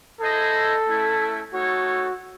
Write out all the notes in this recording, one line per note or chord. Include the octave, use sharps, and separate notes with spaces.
E4 G#4 A4 C5 D#5
A3 C#4 E4
A3 D#4 F#4 A4 C#5